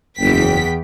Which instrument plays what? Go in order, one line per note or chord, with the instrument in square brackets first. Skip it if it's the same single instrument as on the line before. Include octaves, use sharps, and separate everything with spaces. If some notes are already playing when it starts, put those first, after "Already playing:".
[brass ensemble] F#1 [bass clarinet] E2 [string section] E3 G5 B6